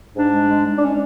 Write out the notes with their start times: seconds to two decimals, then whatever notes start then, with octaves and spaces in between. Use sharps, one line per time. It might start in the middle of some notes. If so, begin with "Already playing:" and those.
0.16 G#2 D4
0.33 G#3
0.49 G#3
0.66 G#3
0.77 D4
0.82 C#4